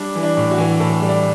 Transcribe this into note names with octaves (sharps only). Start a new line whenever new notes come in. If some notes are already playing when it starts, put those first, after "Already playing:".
Already playing: G3 D4
E3
D4
A2
F#4
E3
A2 A4
G3
D5